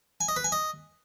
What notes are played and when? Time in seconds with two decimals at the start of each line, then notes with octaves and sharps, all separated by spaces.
0.21 G#5
0.28 D#5
0.36 B4
0.44 G#5
0.52 D#5